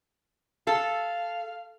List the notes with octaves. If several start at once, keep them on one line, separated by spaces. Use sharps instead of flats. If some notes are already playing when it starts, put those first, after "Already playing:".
A4 F5